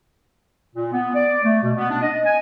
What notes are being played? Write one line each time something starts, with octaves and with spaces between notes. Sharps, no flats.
A#2
B3
D5
A3
B2
B3
D4
D#5
G#5